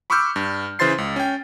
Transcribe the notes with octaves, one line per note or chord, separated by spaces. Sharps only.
B5 C#6 D6 E6 F6 G6
G2
C#3 E3 C5 C6 A6 C7
C#2
C#4 G5